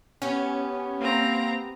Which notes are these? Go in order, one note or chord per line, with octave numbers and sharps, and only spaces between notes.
B3 C#4 G4
A#3 C4 A#5